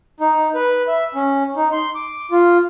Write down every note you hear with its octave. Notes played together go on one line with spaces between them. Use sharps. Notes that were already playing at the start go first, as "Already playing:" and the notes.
D#4
B4
E5
C#4
D#4
C6
D6
F4